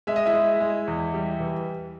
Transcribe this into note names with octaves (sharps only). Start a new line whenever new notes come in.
G#3 E5
D#5
E4 E5
G#3
G#3
E2
G3
E3